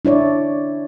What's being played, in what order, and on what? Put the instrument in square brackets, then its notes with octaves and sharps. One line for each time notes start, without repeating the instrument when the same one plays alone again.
[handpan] D4 E4 C#5 D5